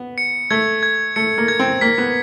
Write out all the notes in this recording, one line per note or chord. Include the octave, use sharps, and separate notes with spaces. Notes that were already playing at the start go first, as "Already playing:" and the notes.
Already playing: B3
C#7
A3 G#6
G#6
A3 C#7
A#3
G#6
C4
A#3 B6
B3